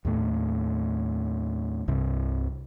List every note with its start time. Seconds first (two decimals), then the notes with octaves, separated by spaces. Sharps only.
0.05 D#2 A2 A3
1.88 C2 G2 C3